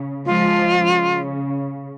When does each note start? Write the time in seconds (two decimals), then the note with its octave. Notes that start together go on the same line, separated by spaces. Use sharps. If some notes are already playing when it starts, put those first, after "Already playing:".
Already playing: C#3
0.26 F3 G#3 F4
0.79 C#3